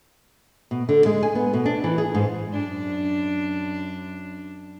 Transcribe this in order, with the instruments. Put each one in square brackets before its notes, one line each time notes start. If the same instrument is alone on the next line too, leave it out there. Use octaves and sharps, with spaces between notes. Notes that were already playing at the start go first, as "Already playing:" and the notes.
[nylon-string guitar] B2
D3
G#3
G#5
B3
B2
D4
E3
G#4
G#2
[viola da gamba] F#2 D4